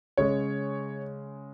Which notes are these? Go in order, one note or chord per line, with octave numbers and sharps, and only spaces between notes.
C#3 G#3 C#5